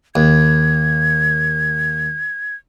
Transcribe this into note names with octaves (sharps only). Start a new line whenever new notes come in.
D#2 G#6